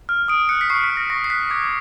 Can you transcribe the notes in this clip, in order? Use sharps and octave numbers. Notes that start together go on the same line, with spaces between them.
F6
D#6 D7
F#6 C#7
B6
C#6 C7
B6
F6
A#6
C#6 A#6
C7
F#6 B6
D6 G#6